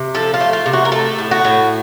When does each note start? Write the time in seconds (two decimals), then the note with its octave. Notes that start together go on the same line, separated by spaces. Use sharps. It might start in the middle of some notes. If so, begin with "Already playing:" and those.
Already playing: C3
0.14 F3 A4
0.34 F4
0.41 A3
0.53 F4
0.66 C3
0.73 F#4
0.85 A#4
0.92 A3 A4
1.19 A2
1.31 F#4
1.45 A2